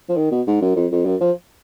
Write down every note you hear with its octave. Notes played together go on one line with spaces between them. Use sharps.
F3
D#3
B2
G#2
F#2
F2
F2
F#2
F3